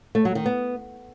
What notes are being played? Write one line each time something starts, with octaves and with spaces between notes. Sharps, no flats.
A3
F#3
D#3
B3